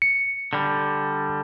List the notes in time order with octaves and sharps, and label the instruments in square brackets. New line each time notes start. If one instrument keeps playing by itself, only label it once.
[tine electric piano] C#7
[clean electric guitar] D3 G3